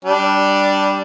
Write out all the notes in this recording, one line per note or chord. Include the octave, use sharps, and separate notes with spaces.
G3 D4